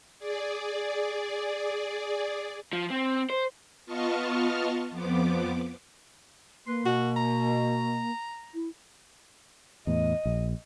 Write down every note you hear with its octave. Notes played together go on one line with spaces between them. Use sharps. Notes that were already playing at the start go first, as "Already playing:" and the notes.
G#4 D5
F3
C4
C5
B3 F4 D#5 A5 C#6 F6
F2 F3 B3 D6
A#3 B4 C6
B2 F#4
A#5
E4
E2 A2 D#5
A#1